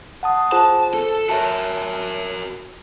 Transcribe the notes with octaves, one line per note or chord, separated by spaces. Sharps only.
F#5 A5 D#6
F4 G#4 C5 A5
A4
F#4 A#4 C#5 E5 A5